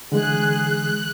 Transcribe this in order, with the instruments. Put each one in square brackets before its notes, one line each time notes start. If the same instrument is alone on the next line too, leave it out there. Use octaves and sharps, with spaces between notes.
[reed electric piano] D3 E3 G#3 [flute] G#4 [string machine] F#6